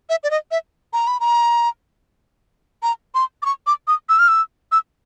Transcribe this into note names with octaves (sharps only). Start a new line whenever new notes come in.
E5
D5
D#5
E5
A#5
B5
A#5
A#5
C6
D6
C#6
D6
D#6
E6
F6
E6
E6